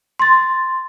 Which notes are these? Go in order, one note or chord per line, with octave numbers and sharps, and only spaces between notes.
C6 A6